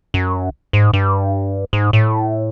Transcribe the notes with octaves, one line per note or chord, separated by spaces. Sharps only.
F#2
G#2
G2
G#2
A2